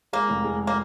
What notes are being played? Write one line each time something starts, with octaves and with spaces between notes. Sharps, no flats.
G#3 A#3
F1
G#3
A#3